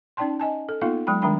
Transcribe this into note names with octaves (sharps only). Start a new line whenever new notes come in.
C#4 D#4 D5 G5 A5 C6
D#5 G#5 A5
A4
A#3 B3 D#4 F4 A4 F5
F#3 G#3 G5 B5
D#3 G3 G#3 D4 G5 B5